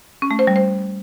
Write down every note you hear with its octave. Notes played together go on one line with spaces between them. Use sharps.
C#4
A3
C5
G3
C5